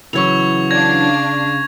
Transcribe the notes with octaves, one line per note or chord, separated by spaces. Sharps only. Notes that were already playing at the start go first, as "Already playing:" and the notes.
C#3 E3 F#3 C#6 G#6 F7
D4 F5 G#6 A#6